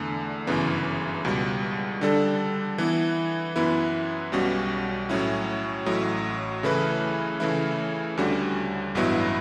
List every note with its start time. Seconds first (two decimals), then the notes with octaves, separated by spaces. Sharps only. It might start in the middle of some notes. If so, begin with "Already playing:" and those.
Already playing: E2 D3 A3
0.47 G1 F#2 C#3 E3 B3
1.25 C#2 B2 G3
2.01 D3 G3 D4 A4
2.78 E3 B3 E4
3.56 F#2 E3 B3 E4 B4
4.32 B1 B2 G3 C#4 F#4
5.09 A2 F#3 C#4 E4
5.86 A1 A2 F#3
6.63 C#3 E3 A3 E4 B4
7.40 C#3 E3 A3 E4
8.17 D2 D3 G3 C#4 F#4
8.95 A1 G2 F#3 B3 E4